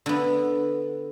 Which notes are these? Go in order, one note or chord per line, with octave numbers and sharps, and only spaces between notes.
D3 B3